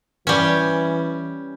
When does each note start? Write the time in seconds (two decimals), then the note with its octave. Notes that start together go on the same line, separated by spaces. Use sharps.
0.27 E3 G3 C#4